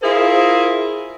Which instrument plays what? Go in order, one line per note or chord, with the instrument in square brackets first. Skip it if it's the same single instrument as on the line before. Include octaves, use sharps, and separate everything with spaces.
[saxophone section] E4 F4 G#4 A#4 C5